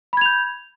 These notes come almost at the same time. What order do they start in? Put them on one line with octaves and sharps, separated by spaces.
B5 G#6 F7 G6